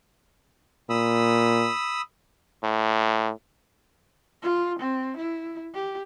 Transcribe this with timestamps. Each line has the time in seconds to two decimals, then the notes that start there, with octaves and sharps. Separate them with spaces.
0.90 A#2 B5 D#6 E6
2.64 A2
4.43 F4
4.79 C4
5.17 E4
5.74 G4